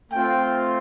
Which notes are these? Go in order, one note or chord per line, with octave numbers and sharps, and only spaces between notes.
A3 C4 F4 G5